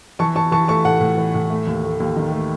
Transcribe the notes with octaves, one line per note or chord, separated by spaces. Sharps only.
E3 A5 C#6
E3 A5 C#6
E3 A5 C#6
A3 A5 C#6
A2 F#5 A5
A2
E3
A2
A3
D#2
A3
D#2
D#3
A3